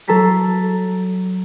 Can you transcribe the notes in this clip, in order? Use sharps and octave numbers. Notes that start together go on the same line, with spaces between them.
F#3 A4 A#5 B6 C7